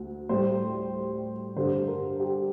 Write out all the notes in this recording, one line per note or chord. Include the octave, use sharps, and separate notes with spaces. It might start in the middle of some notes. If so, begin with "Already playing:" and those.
Already playing: D2
A2 G3 C5
G2 D3 G3 C5
A#4
G4